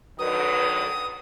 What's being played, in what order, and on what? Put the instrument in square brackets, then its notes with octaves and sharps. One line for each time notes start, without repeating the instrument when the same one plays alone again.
[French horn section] D3 D#3 F#3 [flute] B4 [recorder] D#6